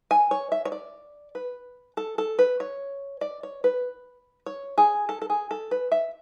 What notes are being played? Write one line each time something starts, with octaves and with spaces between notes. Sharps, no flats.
G#5
C#5
E5
C#5
D5
B4
A4
A4
B4
C#5
D5
C#5
B4
C#5
G#4
A4
A4
G#4
A4
B4
E5